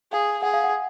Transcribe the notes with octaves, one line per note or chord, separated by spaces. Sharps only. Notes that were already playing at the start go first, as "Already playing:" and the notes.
G#4 F5
G#4 F#5
F5
F#5